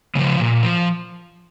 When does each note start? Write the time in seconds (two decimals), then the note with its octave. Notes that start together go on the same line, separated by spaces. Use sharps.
0.15 C#3 G#3
0.19 F3
0.40 A#2
0.63 F3